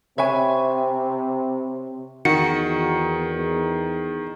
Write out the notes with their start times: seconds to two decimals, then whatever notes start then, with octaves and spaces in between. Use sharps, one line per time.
0.18 C3 C4 C#5 E5 G#5 B5 C#6
2.25 E2 D#3 F#4 C#7